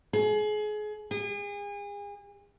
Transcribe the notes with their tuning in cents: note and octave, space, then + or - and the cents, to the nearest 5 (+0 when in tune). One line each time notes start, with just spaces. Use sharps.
G#4 +30
G#4 -35